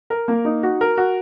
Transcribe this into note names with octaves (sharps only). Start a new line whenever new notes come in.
A#4
A#3
D#4
F#4
A#4
F#4